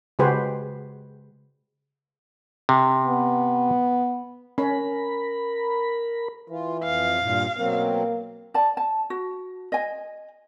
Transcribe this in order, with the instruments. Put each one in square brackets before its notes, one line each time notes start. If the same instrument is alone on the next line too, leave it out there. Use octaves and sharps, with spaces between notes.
[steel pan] C#3 G#3 F#4 G4 B4 C5
[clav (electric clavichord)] C3
[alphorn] B3
[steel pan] C#4 [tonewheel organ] A#4 B5
[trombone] E3 [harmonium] F4
[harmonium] F2 [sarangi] F5
[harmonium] G2 A#2
[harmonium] B2 F#3 C4 [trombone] A#3
[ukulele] D5 A5
A5
F#4
D#5 G#5